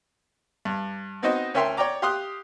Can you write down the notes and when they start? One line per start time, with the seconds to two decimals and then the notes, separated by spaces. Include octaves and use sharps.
0.65 G2
1.22 B3 C4 D#4 F#4 C5 D#5
1.54 D2 C#4 A#4 E5 G5 C6
1.77 C#5 D5 G5 A#5 D6
2.02 G4 F5 C6 D#6 F#6